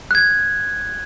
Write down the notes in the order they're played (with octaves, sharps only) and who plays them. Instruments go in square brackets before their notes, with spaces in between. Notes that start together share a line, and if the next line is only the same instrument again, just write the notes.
[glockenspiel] F#6 G#6